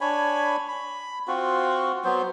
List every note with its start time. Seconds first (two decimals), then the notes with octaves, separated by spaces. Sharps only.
0.01 D4 C#5 G#5 B5
0.68 B5
1.28 C4 F4 F#4
2.04 F#3 B3 C5